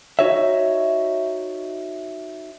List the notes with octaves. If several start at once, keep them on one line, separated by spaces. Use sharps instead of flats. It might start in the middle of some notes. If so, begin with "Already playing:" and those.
D#4 F#4 C#5 D#5 E5